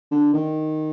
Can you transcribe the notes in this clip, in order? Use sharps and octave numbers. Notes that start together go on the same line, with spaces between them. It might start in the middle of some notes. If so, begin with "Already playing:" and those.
D3
D#3